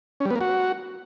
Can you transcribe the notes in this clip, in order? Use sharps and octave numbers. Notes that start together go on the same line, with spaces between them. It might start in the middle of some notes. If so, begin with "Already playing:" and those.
C#4
G3
B3
A#3
F#4